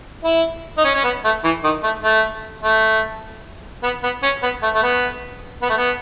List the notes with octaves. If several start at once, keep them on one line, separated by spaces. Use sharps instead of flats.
E4
D#4
C#4
C#4
B3
A3
E3
D#3
A3
A3
A3
B3
B3
C#4
B3
A3
A3
B3
B3
A3
B3